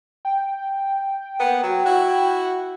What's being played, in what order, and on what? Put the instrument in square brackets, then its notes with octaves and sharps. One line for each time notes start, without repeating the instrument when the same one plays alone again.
[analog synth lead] G5
[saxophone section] A#3 B3
F#3
E4 F#4